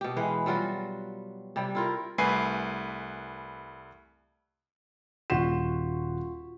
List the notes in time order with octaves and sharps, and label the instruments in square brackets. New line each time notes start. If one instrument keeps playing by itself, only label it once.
[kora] B2 G4
E3 G#3 B4 F5
F#3 G3 F4 F#4
C3 G3
E4 F4 A#4
[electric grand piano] C2 A3 B4 G#5 C7
[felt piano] D#1 F#5 E7 [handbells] F4 F#4